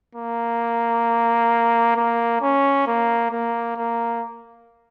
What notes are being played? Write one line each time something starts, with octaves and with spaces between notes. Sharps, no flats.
A#3
A#3
C#4
A#3
A#3
A#3